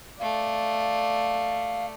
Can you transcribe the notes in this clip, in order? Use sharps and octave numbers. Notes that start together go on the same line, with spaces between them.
A3 D5 F5